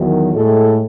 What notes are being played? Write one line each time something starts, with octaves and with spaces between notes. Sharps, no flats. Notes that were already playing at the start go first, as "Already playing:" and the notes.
Already playing: E2 D#3 F#3
A2 G#3 A4